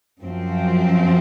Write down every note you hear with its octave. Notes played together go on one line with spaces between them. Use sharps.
F#2 F3 C4